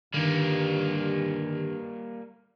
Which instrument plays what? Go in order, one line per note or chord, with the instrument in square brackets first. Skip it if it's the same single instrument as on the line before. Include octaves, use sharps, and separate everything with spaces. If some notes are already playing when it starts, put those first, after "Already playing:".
[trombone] G2 [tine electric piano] D3 D#3 [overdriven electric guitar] G3 A#3